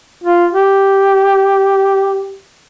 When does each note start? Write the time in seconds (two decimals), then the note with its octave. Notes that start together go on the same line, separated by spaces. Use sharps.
0.24 F4
0.53 G4